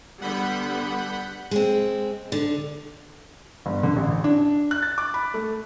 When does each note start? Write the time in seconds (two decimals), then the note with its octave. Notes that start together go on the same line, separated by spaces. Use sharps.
0.21 D3 G3 B3 F#5 B5 G6
1.51 G#3 C4
2.32 D3
3.66 G1
3.83 D3
3.96 A1
4.24 D4
4.71 F#6
4.82 A6
4.98 D6
5.14 B5
5.34 A3